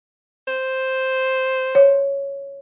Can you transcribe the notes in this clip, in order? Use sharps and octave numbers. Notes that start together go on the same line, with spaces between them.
C5
C#5